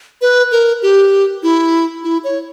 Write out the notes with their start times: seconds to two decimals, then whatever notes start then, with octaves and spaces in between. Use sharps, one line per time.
0.21 B4
0.51 A#4
0.82 G4
1.43 E4
2.04 E4
2.24 C#5